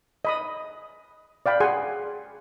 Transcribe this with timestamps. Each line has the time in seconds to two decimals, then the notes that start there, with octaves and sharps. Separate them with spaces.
0.25 D#5 B5 D#6
1.46 D5 F5 G5 B5
1.60 G#4 F#5 G#5 C6